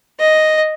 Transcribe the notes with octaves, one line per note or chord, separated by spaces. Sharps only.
D#5